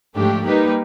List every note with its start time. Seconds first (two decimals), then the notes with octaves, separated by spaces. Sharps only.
0.15 G#2 F3 A3 D4 G4
0.44 G3 A#3 D#4 G4 B4